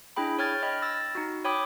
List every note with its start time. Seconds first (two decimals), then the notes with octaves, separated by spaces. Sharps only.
0.16 D4 E4 G#4 G5 B5
0.39 C#5 G5 F6 G#6 A6
0.63 D#5 G5 B5 F6
0.82 E6 A6 A#6
1.15 D#4 F#4
1.45 C#5 G5 B5 D6 D#6